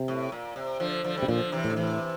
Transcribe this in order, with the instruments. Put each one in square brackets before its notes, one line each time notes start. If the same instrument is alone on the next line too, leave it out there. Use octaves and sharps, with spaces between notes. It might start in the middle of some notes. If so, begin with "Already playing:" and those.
Already playing: [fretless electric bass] C3
[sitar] A2
A#2
C3
D3 F3
D3 F3
G3
[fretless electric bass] C3
[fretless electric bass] A#2 [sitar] D3 F3
[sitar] C3 E3
[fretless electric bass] A2
[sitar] D3
C3 E3